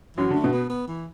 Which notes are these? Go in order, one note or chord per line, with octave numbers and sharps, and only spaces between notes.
F#2 E3 F#3
D3 A3
B2
B3
B3
E3